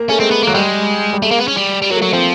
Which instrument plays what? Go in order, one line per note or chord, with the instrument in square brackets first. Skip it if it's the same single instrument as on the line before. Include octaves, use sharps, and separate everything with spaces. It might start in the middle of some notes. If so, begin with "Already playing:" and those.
Already playing: [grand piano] A#3
[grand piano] A3 [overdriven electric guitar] C#4
[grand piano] G#3 [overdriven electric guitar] C4
[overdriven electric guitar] B3
[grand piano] F#3 [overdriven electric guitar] A#3
[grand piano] G3 [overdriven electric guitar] G#3
[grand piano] G3
[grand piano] G#3 [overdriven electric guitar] A3
[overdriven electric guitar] A#3
B3
C#4
G3
G3
[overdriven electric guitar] F#3 [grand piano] A#3
[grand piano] A3
[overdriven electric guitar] F#3 [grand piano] A#3
[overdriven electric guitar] F3 [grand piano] C4